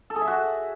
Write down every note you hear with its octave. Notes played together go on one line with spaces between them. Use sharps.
A4
G#4
E5
F#4